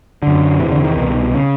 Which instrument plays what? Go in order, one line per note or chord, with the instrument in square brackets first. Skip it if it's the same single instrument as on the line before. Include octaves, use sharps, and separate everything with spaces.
[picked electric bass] F#2 D3
E2 C3 E3
D3
D#3
C2 B2
C#3